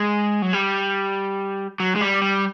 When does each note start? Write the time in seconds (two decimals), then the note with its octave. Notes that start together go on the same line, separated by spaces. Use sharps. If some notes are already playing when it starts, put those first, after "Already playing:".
Already playing: G#3
0.42 F#3
0.53 G3
1.80 F#3
1.96 G#3
2.01 G3
2.22 G3